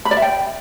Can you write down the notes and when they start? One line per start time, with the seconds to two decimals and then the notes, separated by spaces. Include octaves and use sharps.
0.05 B5
0.11 D5
0.17 E5
0.22 G5